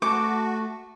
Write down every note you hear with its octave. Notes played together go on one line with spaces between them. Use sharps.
A3 F#4 G#5 A5 D6